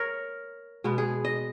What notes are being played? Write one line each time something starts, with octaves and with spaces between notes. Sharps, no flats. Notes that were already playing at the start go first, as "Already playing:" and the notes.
Already playing: A#4 C#5
B2 G#3 B3
G#4
D#5